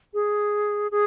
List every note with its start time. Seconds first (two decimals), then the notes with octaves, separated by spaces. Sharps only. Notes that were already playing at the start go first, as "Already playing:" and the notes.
0.14 G#4
0.91 G#4